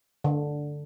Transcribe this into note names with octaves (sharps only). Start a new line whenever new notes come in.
D3